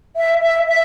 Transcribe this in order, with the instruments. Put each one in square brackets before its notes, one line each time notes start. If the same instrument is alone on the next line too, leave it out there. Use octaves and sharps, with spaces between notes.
[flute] E5
E5
E5